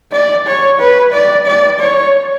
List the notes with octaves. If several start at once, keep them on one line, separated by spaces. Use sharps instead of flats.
D5
C#5
B4
D5
D5
C#5